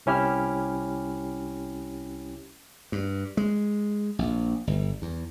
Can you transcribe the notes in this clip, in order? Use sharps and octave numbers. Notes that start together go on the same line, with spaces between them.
C2 C#4 E4 G4 F6
G2
G#3
A#1
G1
E2